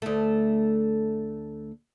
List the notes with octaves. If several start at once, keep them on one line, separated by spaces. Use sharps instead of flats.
D2 A3